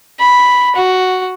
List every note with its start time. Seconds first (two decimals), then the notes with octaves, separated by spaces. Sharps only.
0.20 B5
0.75 F#4